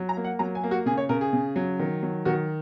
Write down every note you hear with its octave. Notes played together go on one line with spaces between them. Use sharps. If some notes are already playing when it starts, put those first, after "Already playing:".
Already playing: F#3
A#5
A#3
F#5
F#3 A#5
G#5
A#3
F#4
C#3 G#4
C#5
C#3 A#4
G#4
C#3
F#3
D#3
F#3
D#3 F#4